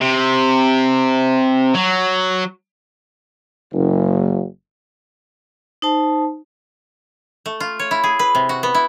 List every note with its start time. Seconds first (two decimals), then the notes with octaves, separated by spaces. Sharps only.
0.01 C3
1.75 F#3
3.73 F#1
5.82 D#4 C5 A5
7.46 A3
7.60 F4
7.79 C#5
7.91 E4
8.04 G#4
8.19 B4
8.35 C3
8.49 F#4
8.63 B3
8.75 E4